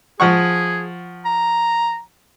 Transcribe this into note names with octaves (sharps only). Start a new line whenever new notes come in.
F3 G#4 F#5 C#6
A#5